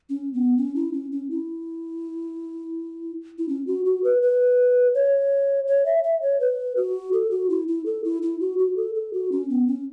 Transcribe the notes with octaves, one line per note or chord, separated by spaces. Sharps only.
C#4
B3
C#4
E4
C#4
C#4
E4
E4
C#4
F#4
F#4
B4
B4
C#5
C#5
E5
E5
C#5
B4
F#4
A4
F#4
E4
E4
A4
E4
E4
F#4
F#4
A4
A4
F#4
C#4
B3
C#4